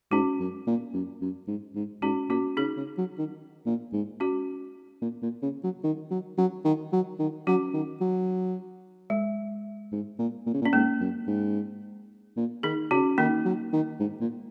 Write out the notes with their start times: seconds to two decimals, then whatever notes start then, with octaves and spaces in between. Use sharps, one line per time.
0.11 G#2 C#4 F#4
0.40 F#2
0.67 A#2
0.94 F#2
1.21 F#2
1.48 G#2
1.75 G#2
2.02 G#2 C#4 F#4
2.29 A#2 C#4 F#4
2.57 C#3 D#4 G#4
2.77 C#3
2.98 F#3
3.18 D#3
3.66 A#2
3.93 G#2
4.20 C#4 F#4
5.02 A#2
5.22 A#2
5.42 C#3
5.64 F#3
5.84 D#3
6.11 F#3
6.38 F#3
6.65 D#3
6.93 F#3
7.19 D#3
7.47 F#3 C#4 F#4
7.74 D#3
8.01 F#3
9.10 G#3
9.92 G#2
10.19 A#2
10.46 A#2
10.54 C#3
10.62 A#2
10.65 C#4
10.73 G#2 A#3
11.01 F#2
11.27 G#2
12.37 A#2
12.63 D#3 D#4 G#4
12.91 C#3 C#4 F#4
13.18 D#3 A#3 D#4
13.45 F#3
13.73 D#3
14.00 G#2
14.21 A#2